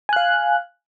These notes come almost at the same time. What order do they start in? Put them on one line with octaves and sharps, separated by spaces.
G#5 F#6 F5